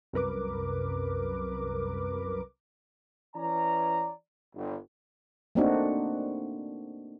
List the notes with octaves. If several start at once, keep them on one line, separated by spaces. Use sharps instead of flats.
C2 F#2 A#4 B4 D6
E3 C#4 D5 A#5
G1
A3 A#3 C4 D4 D#4 F#4